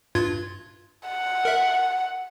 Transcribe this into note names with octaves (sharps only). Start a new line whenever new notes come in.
G2 F4 G#6
F#5
A#4 E5